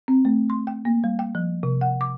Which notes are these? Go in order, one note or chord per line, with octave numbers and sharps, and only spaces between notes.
C4
A3
C6
G5
A#3
G3
G5
F3
C3
F#5
D6